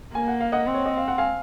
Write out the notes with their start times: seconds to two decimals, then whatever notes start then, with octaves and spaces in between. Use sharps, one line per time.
0.14 A#3 G#5
0.28 F#5
0.40 F5
0.52 D#5 F#5
0.67 C4
0.74 C#5
0.86 D#5
0.97 F5
1.08 F#5
1.18 F5 G#5